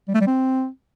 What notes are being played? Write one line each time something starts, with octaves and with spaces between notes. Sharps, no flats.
G3
A3
G3
C4